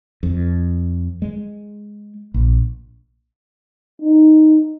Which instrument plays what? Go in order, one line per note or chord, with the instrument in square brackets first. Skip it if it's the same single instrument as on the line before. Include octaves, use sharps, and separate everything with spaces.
[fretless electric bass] F2
G#3
A#1
[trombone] D#4